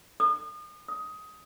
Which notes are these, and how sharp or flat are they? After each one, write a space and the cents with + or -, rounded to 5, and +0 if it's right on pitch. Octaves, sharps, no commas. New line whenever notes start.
D#6 -40
D#6 +15